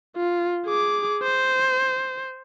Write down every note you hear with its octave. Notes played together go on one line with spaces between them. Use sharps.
F4
G#4 D6
C5